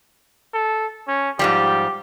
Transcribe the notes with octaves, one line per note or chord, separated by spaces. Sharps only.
A4
C#4
G#2 F3 G3 G4